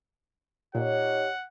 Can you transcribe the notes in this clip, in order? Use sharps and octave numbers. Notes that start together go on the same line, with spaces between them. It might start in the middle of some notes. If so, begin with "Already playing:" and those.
A#2 D#4 G4 C#5 F#5